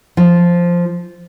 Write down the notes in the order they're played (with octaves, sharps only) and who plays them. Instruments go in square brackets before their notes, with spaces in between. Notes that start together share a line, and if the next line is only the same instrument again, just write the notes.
[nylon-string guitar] F3